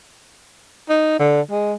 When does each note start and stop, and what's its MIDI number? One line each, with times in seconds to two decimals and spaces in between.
0.89 1.18 63
1.19 1.41 50
1.51 1.74 56